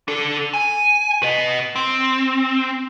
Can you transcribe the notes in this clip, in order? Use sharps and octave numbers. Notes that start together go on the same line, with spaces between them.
D4 A4
G#5
B4 D#5
C4